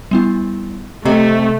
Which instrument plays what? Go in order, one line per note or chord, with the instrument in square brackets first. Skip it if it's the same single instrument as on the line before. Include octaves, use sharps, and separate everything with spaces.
[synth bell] G3 B3 E4
[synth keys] C3 [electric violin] A3 [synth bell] D#5 E5 A#5